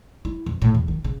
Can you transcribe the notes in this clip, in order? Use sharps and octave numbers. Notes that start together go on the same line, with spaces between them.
E4
F2
A2
E2
D#3
C#3